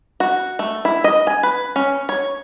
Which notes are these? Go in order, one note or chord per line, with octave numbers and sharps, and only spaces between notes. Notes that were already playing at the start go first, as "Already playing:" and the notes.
F#4
A3
E4
D#5
G#5
B4
C#4
C#5